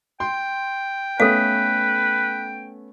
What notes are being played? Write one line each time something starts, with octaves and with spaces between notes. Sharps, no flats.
G5 C6
A3 B3 C#4 A4 B4 F5